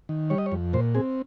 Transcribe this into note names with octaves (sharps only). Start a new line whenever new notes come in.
D#3
G3 C#5
D#5
C#5
F2
A#2 C5
C4 G#4